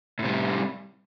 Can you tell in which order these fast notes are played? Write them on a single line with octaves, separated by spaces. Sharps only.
A2 C3 G3